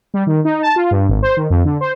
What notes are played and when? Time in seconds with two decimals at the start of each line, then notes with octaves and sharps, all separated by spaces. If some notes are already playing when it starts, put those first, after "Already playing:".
0.14 G3
0.27 D#3
0.45 D#4
0.62 A5
0.76 F4
0.91 G2
1.09 G#1
1.22 C5
1.37 D#3
1.50 F2
1.65 D3
1.81 C5